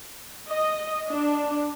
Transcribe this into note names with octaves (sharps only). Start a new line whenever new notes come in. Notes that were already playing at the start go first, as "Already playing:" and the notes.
D#5
D4